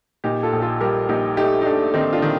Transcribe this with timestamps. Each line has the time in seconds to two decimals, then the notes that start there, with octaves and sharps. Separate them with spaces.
0.24 A#2 D#4 G4
0.43 F4 A4
0.53 A#1
0.61 F4 A4
0.81 G3 G4 A#4
1.09 A#1 D#4 G4
1.37 A3 D#4 G4
1.61 D#4
1.65 A3 D4
1.94 D#3 C4 D#4
2.13 D4 F4
2.22 D#3